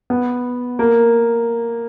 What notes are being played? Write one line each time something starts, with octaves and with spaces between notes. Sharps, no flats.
B3
A#3